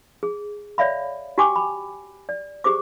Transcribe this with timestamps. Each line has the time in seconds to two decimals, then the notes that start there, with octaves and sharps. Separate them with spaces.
0.23 G#4
0.78 C#5 D5 E5 F5 B5
1.38 F#4 G4 G5 G#5 D6
1.56 B5
2.29 D5
2.64 G4 G#4 C5 D6